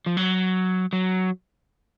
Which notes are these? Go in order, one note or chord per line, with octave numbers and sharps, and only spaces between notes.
F3
F#3
F#3